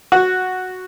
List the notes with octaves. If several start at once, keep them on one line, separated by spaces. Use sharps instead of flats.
F#4